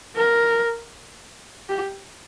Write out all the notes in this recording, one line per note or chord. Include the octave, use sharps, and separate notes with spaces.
A#4
G4